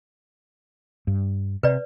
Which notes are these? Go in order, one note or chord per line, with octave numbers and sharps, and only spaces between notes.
G2
C3 B4 D5